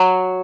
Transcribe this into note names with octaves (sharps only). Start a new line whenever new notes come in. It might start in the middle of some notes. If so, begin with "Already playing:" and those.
Already playing: F#3